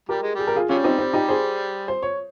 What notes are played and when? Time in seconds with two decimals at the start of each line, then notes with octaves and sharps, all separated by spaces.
0.09 G3 G4 A#4
0.22 G#3
0.35 G3 G#4
0.47 A#4
0.56 F4 G#4
0.69 C3 G3 C#4 F4
0.84 C4 D#4
0.99 C4
1.13 D#4 G4
1.29 G#4 C5
1.88 C5
2.03 C#5